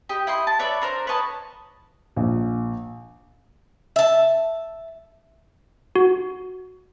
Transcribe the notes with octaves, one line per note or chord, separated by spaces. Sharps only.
G4 D#5
E4 D#5 C6
A5
B4 C#5 D5 E5
D4 A#4 C5
B4 C#5 D#5 A5
A#1
E5 A5
F#4